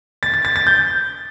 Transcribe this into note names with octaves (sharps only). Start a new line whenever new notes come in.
A6
A6
A6
A6
G6